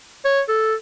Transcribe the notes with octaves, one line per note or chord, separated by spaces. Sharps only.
C#5
A4